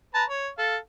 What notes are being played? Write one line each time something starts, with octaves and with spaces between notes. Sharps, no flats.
B4 A5 A#5
C#5
A4 F5